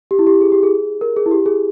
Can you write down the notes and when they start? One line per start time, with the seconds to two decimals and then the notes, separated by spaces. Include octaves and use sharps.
0.11 G4
0.19 E4
0.27 G4
0.41 G#4
0.52 G4
0.63 G#4
1.01 A#4
1.16 G#4
1.26 E4
1.31 G4
1.46 G#4